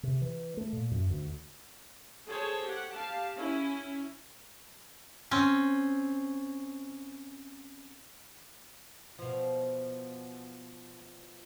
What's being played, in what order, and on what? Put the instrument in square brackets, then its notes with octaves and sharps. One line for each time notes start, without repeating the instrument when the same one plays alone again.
[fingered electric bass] C3
E3
A3
A#2
F#2
D2
[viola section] G#4 A4 C5 C#5 A5
G4 F#5
G4 F5 A5
C#4 E4
[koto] C4 C#4
[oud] B2 F3